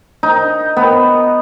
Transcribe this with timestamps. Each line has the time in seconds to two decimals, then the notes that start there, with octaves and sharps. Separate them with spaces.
0.23 D#4
0.77 B3